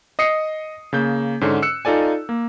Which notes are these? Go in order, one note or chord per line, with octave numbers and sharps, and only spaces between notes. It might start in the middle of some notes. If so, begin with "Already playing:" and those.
D#5 D#6 C7 C#7
C#3 A#3 G6
G#2 D3 C#4
E6 F#6 C#7
D#4 F4 A4 D5 G#5
A#3